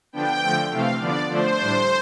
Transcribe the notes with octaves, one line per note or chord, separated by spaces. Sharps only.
D3 F3 B3 D4 G5
D3 F3 A3
C3 E3 A3 C4 F5
D3 F3 B3 D4 D5
D3 F3 A3 D4 C5
A2 G3 D4